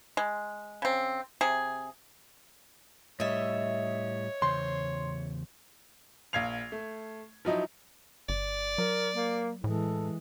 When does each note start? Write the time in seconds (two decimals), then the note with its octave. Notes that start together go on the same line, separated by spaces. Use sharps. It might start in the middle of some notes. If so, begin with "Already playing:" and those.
0.17 G#3
0.82 C#3 C4
1.41 C3 G#4
3.20 A2 G3 C#5 D#5 E5
4.42 E2 C#3 C5 C6
6.33 A#1 F5 G#6 C7 F7
6.72 A3
7.45 F3 F#3 D#4 E4
8.29 G1 D5
8.78 F#3 A#4
9.15 A#3
9.64 A2 E3 G#3 A4